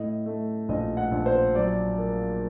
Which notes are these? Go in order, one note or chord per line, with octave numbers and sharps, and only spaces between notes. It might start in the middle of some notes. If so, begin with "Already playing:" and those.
Already playing: A2 D#5
A3
A#1 D#5
F#5
A#1
C5
F#3 D5
A#3